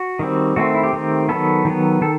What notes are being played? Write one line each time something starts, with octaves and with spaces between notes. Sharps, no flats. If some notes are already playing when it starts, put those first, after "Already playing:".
Already playing: F#4
D#3 G3 C4
D#3 A3 C4 F#4
E4
G4
D#3 A3 C4
D#3 F#3 B3 A4
D#3 F#3 B3
D#3 A4